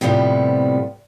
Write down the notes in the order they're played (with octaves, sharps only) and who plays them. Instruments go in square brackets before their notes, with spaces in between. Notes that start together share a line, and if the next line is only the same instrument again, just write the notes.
[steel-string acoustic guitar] A2 C3 F3 G3 B3